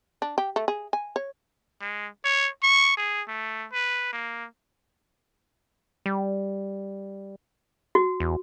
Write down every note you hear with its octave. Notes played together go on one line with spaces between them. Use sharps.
D4
G4
A3
G#4
G#5
C#5
G#3
C#5
C#6
G#4
A3
B4
A#3
G3
F#4
E2